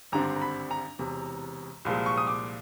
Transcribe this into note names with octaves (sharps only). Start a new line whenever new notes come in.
G#1 G2 D3 G3 C4 A#5
A#5
B5
A#5
E1 E2 C3
C2 A#2 F3 G#3
C#6
D#6
D6